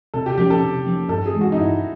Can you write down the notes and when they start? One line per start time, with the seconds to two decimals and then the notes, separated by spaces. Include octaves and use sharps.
0.14 C3 A4
0.26 G4
0.37 F3 A#3 C#4 G4
0.50 A4
0.62 C3
0.86 F3 A#3 C#4
1.09 G2 A4
1.26 G#4
1.33 E3 G#3
1.41 F#4
1.52 D#4
1.57 G2 E4